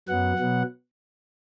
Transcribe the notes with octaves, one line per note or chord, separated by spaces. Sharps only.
F#2 F#3 B3 F#5
B2 F#3 B3